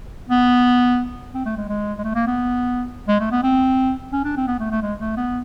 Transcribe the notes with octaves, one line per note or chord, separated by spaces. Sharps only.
B3
C4
A3
G#3
G#3
G#3
A3
A#3
B3
G#3
A3
B3
C4
C#4
D4
C4
B3
A3
A3
G#3
A3
B3